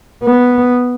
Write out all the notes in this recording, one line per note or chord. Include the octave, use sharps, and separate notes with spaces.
B3